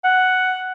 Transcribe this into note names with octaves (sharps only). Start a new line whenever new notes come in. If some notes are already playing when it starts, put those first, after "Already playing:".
F#5